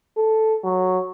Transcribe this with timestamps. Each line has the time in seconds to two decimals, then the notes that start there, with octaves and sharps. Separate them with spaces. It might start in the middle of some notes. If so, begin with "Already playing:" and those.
0.17 A4
0.64 F#3